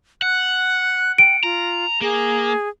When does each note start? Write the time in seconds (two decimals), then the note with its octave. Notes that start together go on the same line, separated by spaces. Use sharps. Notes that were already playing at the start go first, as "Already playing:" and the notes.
0.22 F#5 F#6
1.18 G5 D7
1.43 F4 A#5
2.01 A#3 G#4